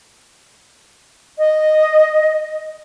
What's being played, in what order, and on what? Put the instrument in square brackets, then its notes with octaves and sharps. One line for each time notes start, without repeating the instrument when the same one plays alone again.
[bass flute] D#5